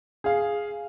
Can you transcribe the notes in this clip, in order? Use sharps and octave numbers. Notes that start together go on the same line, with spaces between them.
G#4 F5